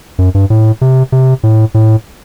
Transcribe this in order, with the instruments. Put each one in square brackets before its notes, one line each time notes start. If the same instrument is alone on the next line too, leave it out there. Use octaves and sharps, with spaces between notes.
[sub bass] F#2
G2
A2
C3
C3
A2
A2